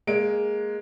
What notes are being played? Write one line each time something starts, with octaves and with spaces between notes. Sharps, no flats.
G#3 A#3 D7